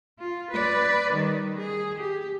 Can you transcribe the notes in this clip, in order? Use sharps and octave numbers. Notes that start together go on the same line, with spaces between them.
F4
B4 D5
D#3 G3
G#4
G4